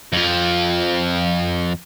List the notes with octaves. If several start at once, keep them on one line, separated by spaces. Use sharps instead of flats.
F2 F3